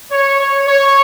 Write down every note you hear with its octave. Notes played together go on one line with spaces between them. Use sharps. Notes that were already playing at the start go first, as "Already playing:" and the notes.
C#5
C#5
C#5